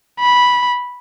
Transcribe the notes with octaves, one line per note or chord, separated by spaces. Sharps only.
B5